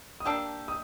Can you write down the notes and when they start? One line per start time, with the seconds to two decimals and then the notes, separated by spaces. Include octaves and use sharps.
0.20 D#6
0.25 A#3 D4 G4 E6
0.68 D#6